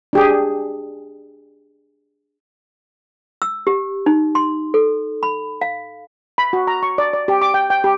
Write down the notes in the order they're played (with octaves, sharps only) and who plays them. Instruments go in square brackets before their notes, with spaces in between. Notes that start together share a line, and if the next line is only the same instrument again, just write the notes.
[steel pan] D4 G4 G#4
[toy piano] E6
G4
D#4
C6
A4
B5
F5
[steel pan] B5
F#4
A#5
C#6
D5
D5
G4
D6
G5
G5
G4